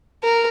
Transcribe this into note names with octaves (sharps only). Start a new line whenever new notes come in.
A#4